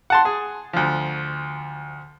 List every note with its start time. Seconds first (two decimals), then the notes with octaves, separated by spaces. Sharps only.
0.10 F#5 A5 C6
0.25 G#4
0.73 D2 F3